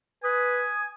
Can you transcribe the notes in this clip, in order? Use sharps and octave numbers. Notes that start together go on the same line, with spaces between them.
B4 G#5 D#6